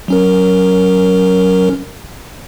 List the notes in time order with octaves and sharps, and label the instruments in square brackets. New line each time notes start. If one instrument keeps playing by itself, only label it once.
[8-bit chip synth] F#3 C#4 A#4